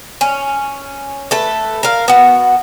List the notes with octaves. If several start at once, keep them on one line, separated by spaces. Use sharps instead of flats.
C#4
A3 A4 B4
A#4 F5
B3 F#4